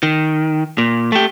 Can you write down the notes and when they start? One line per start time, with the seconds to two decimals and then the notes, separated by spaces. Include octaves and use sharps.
0.03 D#3
0.78 A#2
1.12 A3 G4